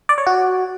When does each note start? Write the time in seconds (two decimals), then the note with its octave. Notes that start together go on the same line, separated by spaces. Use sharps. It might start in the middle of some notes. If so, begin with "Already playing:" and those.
0.09 D5
0.18 C#5
0.27 F#4